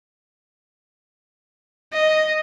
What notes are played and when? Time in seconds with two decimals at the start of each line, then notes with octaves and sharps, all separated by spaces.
1.93 D#5